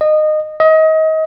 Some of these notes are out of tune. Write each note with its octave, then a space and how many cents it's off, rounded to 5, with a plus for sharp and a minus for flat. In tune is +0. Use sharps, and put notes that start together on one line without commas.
D#5 -20
D#5 +30